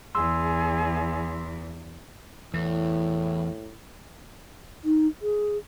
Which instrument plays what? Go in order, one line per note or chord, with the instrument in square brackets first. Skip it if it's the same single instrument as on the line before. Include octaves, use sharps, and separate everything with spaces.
[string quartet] E2 [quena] G#4 [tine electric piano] C6 E6
[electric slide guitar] E2 [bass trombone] A2 [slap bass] E3
[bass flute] D#4
G#4